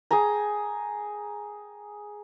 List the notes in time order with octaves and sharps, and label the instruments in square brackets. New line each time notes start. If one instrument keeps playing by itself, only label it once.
[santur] G#4 G5 G#5 A#5